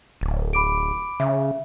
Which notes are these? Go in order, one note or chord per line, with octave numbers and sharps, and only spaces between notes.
D1
B5 D6 D7
C#3 E5